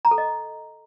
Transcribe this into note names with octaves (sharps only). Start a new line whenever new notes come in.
A#5
A4
D#5